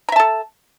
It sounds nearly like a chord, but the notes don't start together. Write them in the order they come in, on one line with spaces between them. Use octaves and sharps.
A#5 E5 A5 A4